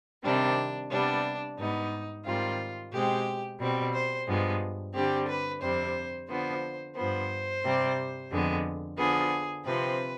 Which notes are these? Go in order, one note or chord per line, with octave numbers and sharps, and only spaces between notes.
C3 D#3 G3 C4 D4
C3 G3 B3 D4
G#2 G3 B3 D#4
G#2 D#3 G3 C4 F4
B2 G#3 C4 G4
B2 G3 C4
C5
G2 F3 G#3 B3
D3 G3 C4 G4
B4
F2 C3 G3 C5
D3 F3 B3 C5
G2 F3 B3 C5
C3 G3 C4
F2 D3 G#3 B3
D3 F3 B3 G#4
C3 F3 C4 B4